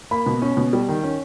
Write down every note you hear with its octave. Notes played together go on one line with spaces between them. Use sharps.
A#3 B5
B2
C#4
B2
G3
D#3
C#4